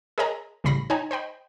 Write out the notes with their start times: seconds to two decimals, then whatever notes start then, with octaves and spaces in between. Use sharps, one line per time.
0.18 G#4 A#4 C#5 D#5 G#5 A#5
0.64 A1 C#3 G3 B5 A#6 C7
0.90 D#4 C#5 G5 G#5 A#5
1.11 C5 D#5 G5 B5